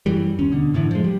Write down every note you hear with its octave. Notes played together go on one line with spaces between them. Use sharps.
F#2 E3 G3
D#2 C#4
B2 D3
F#2 A2 D3 E3
F3 G#3
G3